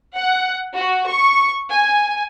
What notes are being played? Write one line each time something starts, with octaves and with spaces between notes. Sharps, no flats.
F#5
F#4
C#6
G#5